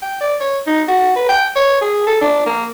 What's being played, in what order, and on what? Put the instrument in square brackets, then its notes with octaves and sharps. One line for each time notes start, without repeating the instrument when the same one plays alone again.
[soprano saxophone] G5
D5
C#5
D#4
F#4
B4
G5
C#5
G#4
A4
D4
A#3